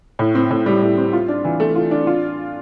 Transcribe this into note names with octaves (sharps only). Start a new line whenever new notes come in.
A2
C4
A2
G3
A2
C4
F4
D4
E3
A3
F4
D4
F4